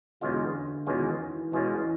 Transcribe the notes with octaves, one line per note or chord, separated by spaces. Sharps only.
E2 B2 D3 G#3 C#4 F4
E2 B2 D#3 G#3 C#4 F4
E3
E2 B2 G#3 C#4 F4